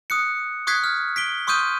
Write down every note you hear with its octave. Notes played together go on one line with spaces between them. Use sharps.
D#6 F#6 C#7
C#6 D#6 F#6 G#6 B6 C7
F6
B6 D7 G7
C6 C#6 D#6 F6 G6 D#7